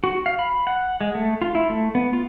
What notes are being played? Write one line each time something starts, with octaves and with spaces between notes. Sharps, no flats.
F#4
F5
B5
F#5
G#3
A3
F4
E4
A3
B3
F4